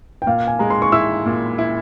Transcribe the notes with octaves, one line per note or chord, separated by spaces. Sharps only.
G5
A#2 F5
G#5
G#3 A#5
C6
C#6
E4 E6
A#2
E4